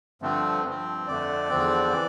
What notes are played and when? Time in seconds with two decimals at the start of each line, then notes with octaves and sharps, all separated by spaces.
0.22 G2 D3 F3 A3 C4
0.65 G2 F3 C4
1.07 F2 D3 A3 D5
1.50 E2 D3 F3 C4
1.93 E3